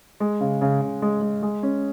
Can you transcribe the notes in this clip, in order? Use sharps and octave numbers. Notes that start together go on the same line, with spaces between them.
G#3
C#3
C#3
C#3
G#3
G#3
G#3
C#4